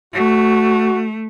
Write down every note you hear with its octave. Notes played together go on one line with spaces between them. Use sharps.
A3 F#4